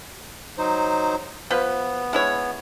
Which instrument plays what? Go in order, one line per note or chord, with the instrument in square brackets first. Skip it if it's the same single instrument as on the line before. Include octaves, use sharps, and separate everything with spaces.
[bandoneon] F#3 D#4 C5
[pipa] F3 B4 [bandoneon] B3
[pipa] G#3 E4 C#5